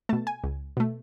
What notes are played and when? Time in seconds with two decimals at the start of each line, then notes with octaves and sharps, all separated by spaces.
0.09 B2 A3 A5
0.27 G#5
0.44 C#2
0.77 B2 A3